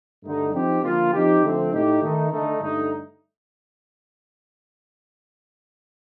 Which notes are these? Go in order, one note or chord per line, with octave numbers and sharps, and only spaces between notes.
G2 D3 A3 D#4
F3 C4 D#4 G4
D3 F3 A#3 F4
F3 C4 D#4 G4
D3 F3 A3 C4
A2 A3 D#4 G4
D#3 A3 D#4
D3 A3 D#4
G2 D3 A3 D#4